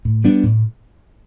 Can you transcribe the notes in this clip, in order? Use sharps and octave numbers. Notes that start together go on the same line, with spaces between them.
A2
G3 B3 D4
A2